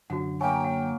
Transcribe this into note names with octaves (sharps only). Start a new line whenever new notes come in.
F#2 D3 F#4 F#5
F#3 A#3 G5 G#5
F#5